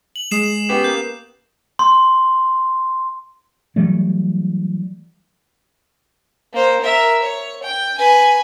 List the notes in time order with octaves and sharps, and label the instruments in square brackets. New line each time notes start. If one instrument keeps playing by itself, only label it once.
[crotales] F#7
[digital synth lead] G#3 [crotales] D#6 C7 E7
[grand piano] B3 C#4 G4
[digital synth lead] A#3 [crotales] G6
[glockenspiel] C6
[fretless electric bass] E3 F#3 G3 A3
[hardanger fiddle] A#3 C5
A#4 E5
C#5
G5
B4 G#5